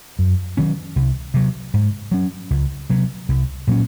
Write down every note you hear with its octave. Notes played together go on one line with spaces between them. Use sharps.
F#2
D#3 F#3 C#4
C2
C3 F#3
G#2
F#3 C#4
C#2
C3 F#3
C2
A#2 F#3 C#4